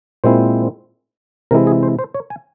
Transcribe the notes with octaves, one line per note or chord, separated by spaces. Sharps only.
A#2 G#3 C4 E4 C5
C3 E3 G#3 E4 A#4
G#4
C5
C5
C#5
G#5